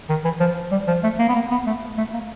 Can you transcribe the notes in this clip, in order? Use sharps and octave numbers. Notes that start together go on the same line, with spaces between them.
D#3
E3
F3
G3
F3
A3
A#3
B3
A#3
B3
A3
A3
A#3